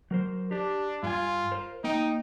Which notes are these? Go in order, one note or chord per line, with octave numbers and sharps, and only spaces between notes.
F#3 A#4 C5
D4 G4
G2 F4 F#4 G#5
A#4 C5
A#3 D#4 G5